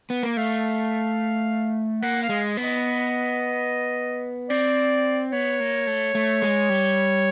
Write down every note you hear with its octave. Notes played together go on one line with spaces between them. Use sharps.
B3
A#3
A3 F5
A#3 F#5
F5
G#3
B3
D#5
C4 D5
B3 C#5
A#3
A3
A3
G#3
G3